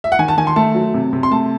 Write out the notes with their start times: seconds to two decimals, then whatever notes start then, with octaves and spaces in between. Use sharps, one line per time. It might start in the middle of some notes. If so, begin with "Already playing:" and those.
0.04 E5
0.12 F#5
0.19 D#3 G#5
0.28 A5
0.38 D#3 G#5
0.47 C6
0.56 A3 A5
0.75 F#3
0.94 C3
1.13 C3
1.23 C6
1.31 A3 A5